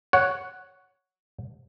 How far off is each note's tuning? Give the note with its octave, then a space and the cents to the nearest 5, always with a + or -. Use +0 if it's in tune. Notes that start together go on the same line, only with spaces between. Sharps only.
C#5 +5 F#5 +0